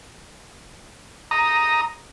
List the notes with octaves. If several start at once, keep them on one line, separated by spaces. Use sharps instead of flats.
A#5 D#6